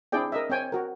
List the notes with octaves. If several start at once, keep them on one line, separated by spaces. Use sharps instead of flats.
C4 D4 E4 G#4 D5 G5
A#4 D#5 E5
C4 C#5 G5 G#5
F#4 A#4